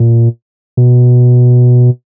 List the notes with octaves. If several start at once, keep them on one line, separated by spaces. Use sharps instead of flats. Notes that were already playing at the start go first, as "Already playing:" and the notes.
Already playing: A#2
B2